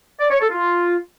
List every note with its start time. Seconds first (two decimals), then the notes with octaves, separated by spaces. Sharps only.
0.20 D5
0.30 C#5
0.40 A4
0.50 F4